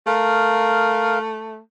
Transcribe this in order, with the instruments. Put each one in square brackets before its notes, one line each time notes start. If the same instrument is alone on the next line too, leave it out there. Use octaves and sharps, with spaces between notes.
[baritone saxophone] A3 [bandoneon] A#4 F5